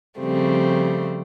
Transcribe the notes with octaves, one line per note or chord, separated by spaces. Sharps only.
C#3 F3 G3 A3 C4